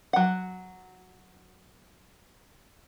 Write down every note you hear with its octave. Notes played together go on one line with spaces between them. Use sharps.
F#3 F#5